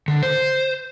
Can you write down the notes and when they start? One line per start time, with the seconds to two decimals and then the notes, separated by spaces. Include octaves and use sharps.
0.08 D3
0.22 C5